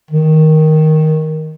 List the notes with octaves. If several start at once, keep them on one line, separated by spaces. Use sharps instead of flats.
D#3